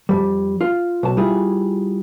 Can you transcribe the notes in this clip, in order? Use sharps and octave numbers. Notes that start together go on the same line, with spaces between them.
F2 G#2 G3
F4
B1 A5
G3 E4 F4 G#4